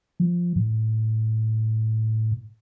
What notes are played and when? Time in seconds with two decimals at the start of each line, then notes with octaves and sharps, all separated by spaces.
0.20 F3
0.56 A2